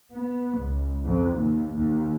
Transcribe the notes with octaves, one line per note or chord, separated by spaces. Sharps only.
B3
C#2
F2
D#2
D#2